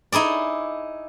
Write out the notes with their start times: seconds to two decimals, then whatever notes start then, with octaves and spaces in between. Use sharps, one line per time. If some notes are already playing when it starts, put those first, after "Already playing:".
0.12 D#4 E4 G#4 D5